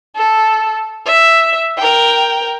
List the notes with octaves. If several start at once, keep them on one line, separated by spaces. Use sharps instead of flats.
A4
E5
A#4 G5